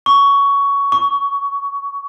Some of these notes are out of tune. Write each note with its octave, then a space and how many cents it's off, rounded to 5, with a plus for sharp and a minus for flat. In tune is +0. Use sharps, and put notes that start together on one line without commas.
C#6 +15
C#6 +30